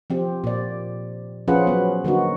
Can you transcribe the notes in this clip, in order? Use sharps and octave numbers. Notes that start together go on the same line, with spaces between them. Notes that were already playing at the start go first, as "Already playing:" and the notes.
F3 C4 G4
A#2 D5
F3 C#4 F4 G#4 B4 F#5
F#3 B3
D3 A#3 D#4 F#4